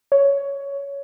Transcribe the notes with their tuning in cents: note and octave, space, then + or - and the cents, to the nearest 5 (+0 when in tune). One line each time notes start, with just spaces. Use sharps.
C#5 +10